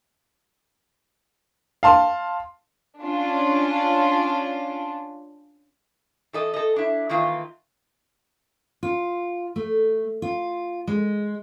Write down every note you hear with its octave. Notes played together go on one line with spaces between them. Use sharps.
F5 A5 C6
C#4 D4 F4
E3 A4 D#5
A4 D#5
D4 E4
D#3 E3 A#3 F4
F4
A3
F4
G#3